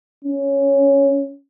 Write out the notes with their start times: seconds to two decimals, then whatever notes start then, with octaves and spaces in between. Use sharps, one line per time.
0.24 C#4